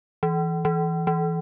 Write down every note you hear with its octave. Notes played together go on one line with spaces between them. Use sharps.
E3
E3
E3